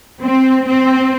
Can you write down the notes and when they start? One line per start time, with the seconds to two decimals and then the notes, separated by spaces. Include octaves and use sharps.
0.23 C4
0.68 C4